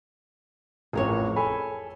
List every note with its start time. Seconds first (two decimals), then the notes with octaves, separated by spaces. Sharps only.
0.93 A1 F2 G#4 A#4 C#5
1.36 A4 G#5 B5